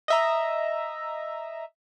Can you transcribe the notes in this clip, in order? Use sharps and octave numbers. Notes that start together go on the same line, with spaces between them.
D#5 E5 A#5